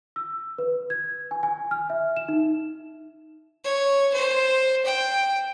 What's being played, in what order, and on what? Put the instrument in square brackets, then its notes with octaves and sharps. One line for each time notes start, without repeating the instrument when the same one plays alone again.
[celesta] E6
B4
G#6
G#5
G#5
F6
E5
E7
D#4
[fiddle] C#5
C5
G5